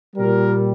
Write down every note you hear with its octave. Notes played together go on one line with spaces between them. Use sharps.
A#2 G3 A#4